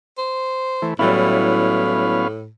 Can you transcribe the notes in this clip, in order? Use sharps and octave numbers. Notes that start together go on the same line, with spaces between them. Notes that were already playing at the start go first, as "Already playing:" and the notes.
C5
E3 A3
A2 F#3 G3 B3 C#4 E4 F5